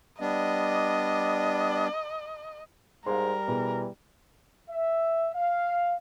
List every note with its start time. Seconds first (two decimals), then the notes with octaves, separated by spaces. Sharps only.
0.21 G3 B3 D4 D#5
3.06 G#2 G3 A#4 F5 C6
3.48 B2 E3 G#4
4.70 E5
5.34 F5